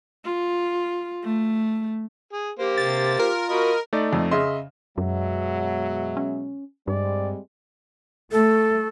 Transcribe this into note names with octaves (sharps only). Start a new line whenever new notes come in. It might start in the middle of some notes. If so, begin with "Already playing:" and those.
F4
A3
G#4
A#3 G4 C5
C3 A6
F4 A#4
F#4 D#5 B5
A3 D#4 D5
F2
C#3 D#5 E5 C6
F#2 B2 F#3 G#3 E5
C#4
G2 G3 G#3 C4 D5
A3 A4